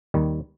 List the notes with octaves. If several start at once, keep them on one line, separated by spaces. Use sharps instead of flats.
D#2 D#3 G3